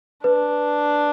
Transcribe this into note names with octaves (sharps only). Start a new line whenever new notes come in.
D4 B4